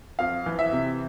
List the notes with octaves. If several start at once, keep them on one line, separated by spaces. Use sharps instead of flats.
F2 F5
E3
E5
C3